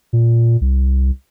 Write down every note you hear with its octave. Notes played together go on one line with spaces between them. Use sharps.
A#2
C2